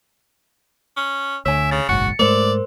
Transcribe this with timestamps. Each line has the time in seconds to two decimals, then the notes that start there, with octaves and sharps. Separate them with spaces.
0.97 C#4
1.46 D2 D3 C#5 E5 G#5
1.71 C#3 A6
1.89 F#1 B1 G#2 F#4 C#7
2.19 G#2 G#3 A3 A#4 C5 D5